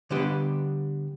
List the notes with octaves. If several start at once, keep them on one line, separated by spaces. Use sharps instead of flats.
D3 G3 B3 D4 G4 D#5